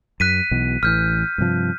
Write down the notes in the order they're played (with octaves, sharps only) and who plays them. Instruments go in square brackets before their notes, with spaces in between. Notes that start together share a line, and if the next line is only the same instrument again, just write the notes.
[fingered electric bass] F#2 [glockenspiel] F#6 B6 D#7
[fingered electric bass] B1 B2 E3
[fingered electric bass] A1 E3 [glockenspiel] F6 G6
[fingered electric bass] G2 C3 F3